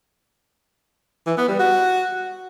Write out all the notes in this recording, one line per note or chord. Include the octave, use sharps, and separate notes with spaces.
E3
B3
G3
F#4